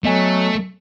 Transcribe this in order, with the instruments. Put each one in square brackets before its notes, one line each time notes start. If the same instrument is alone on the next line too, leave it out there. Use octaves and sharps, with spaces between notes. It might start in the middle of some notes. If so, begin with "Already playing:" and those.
[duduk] F#3 [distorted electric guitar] A3 [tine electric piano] B3 D#5 G#5